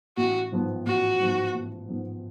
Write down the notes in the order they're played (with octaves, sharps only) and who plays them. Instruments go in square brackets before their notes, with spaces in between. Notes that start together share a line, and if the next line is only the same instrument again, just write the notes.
[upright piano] A1 [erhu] F#4
[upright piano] G#2 F3 B3
[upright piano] A1 [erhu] F#4
[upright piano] G#2 F3 B3
A1
G#2 F3 B3